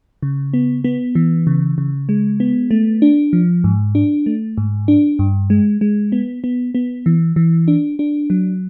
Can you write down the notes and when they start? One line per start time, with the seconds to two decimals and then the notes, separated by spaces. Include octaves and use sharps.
0.23 C#3
0.54 B3
0.84 B3
1.15 E3
1.47 C#3
1.78 C#3
2.09 G#3
2.40 B3
2.71 A3
3.02 D4
3.33 F3
3.64 G#2
3.95 D4
4.26 A3
4.58 G#2
4.88 D4
5.19 G2
5.50 G#3
5.81 G#3
6.12 B3
6.44 B3
6.75 B3
7.06 E3
7.36 E3
7.68 D4
7.99 D4
8.30 F#3